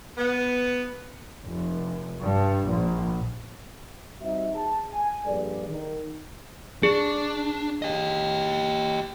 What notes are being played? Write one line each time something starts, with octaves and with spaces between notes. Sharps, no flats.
B3
F1
G2
A#1
G3 C4 D#4 F#4 E5
G#4 A5
G#5
A#1 G2 G#4 A4 D5
D#3
D4 G#4
G4 D#5